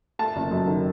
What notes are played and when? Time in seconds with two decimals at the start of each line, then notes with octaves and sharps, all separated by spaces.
0.19 A3 A5
0.36 F#1
0.51 F#2
0.67 D#3